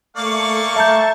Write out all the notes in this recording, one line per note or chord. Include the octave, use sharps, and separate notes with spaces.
A3 A#3 D5 F5 C#6
E5 A5 A#5 G6